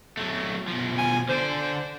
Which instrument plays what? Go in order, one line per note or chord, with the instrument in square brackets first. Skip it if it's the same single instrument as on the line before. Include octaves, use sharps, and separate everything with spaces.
[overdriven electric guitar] F#3 A3
B2 F3
[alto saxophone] G#5
[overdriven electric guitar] D3 D5 [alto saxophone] C5